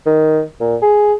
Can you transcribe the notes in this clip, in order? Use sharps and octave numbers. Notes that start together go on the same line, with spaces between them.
D#3
A#2
G#4